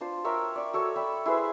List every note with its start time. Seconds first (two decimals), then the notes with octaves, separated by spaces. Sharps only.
0.01 D4 F4 C5
0.24 A#4 C#5 E5 G5
0.56 D5 C#6
0.73 F#4 A4 C#5
0.96 D5 E5 G5 B5
1.26 E4 G#4 B4 C5